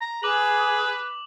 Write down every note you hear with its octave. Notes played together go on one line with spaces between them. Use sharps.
A#5
G#4 B4 D6 F#7